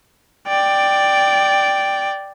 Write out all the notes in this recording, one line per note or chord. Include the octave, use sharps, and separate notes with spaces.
D5 G5